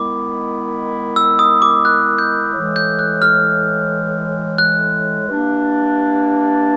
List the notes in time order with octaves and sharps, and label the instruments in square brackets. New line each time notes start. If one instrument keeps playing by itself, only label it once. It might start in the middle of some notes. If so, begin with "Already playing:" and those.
Already playing: [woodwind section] D#3 G#3 B3 E4 [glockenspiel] D6
[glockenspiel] E6
D#6
D6
F#6
G6
[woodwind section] A2 E3 G#3
[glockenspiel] G6
F#6
F6
F#6
[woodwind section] E3 G3 A#3 D4